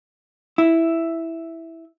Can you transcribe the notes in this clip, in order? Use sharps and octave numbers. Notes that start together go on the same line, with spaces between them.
E4